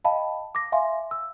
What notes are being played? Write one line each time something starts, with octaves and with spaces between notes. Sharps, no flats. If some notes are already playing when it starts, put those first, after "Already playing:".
D#5 F5 G5 A5 B5
D6 A#6
E5 F5 G#5 C6
E6